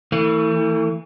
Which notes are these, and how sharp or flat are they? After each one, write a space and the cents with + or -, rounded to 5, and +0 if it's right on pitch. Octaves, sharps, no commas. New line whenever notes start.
E3 -20 A3 +35